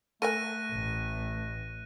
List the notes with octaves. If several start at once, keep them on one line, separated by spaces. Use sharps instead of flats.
A3 A4 A#4 G#5 F#6 A#6 D#7
A1